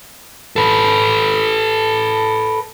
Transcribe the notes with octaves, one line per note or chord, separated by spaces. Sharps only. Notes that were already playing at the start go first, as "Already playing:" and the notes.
A4 B4